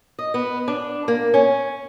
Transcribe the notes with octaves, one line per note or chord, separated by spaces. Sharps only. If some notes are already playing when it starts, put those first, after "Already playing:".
D#5
B3
D4
A#3
C#4